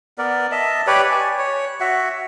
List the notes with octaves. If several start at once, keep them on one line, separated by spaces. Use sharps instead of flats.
B3 A#4 D5
D#5 E5 A5
G4 B4 C#5 D5
G#5
C#5
F#4 E5 F#5